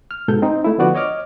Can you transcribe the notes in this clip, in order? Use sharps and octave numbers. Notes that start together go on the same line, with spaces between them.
F6
G#2 B2 A4 G6
C4 D#4
A3 E4
D3 F3 B3 F#4 D5
C#5 D#5 D6 F6